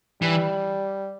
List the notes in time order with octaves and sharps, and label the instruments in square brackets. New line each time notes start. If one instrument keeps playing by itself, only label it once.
[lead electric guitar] E3 [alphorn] G3